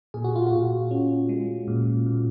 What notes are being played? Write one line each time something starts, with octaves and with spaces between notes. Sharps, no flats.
A#2 G#4
F#4
F4
F#4
A#2
C#4
G#3
A#2
A#2